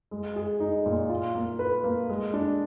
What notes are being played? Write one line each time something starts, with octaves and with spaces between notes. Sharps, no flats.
G#3
G#4
D#4
A#2
F4
A#3
B4
A#3
G#3
D4